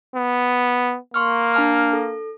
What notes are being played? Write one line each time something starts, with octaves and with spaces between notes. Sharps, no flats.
B3
A#3 C6 C#6 F6
D4 A5 F6
A4